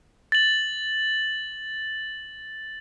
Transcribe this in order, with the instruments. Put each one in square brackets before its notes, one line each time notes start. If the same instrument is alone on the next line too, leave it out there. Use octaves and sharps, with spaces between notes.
[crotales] A6 F#7